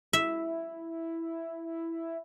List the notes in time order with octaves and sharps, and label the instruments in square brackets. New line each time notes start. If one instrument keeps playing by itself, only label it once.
[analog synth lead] E4 [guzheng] E5